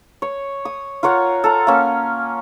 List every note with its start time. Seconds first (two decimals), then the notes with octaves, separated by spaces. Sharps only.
0.22 C#5
0.65 D#6
1.03 F4 A#4 C#5 F#5
1.44 A4 A#5
1.67 A#3 C#4